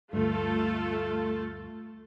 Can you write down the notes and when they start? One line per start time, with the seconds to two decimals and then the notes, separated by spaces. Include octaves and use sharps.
0.13 D2 G2 A3 F4 A4